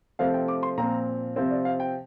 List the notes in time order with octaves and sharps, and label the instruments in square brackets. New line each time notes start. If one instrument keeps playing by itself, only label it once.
[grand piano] C3 F3 A3 C4 F5
G5
D6
C6
A#2 F3 C4 A#5
C3 F3 C4 C5
D5
F5
G5